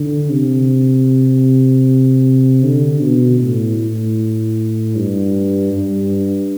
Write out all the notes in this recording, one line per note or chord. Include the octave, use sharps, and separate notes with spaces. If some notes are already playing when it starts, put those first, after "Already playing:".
Already playing: D3
C3
D3
B2
A2
A2
G2
G2